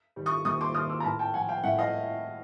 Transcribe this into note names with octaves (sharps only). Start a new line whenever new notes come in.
D#3 G3
C#6 D#6
D#2 C#6 D#6
C6 D6
D#3 G3 D#6 F6
D6 E6
A#5
A2 A5 B5
G5 A5
F3 F#5 G#5
F5 G5
A2 E5 F#5
D#5 F5